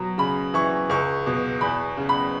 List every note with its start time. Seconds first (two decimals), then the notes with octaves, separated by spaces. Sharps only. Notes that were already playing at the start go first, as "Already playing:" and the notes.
Already playing: B2 F#3
0.18 C#3 B5
0.54 E3 C#6
0.89 C#2 C#6
1.26 B2
1.61 E2 B5
1.97 C#3
2.09 B5